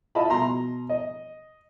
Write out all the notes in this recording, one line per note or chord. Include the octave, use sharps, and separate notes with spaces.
E4 F4 D#5 A5 B5
B2 A#5 C6
D#5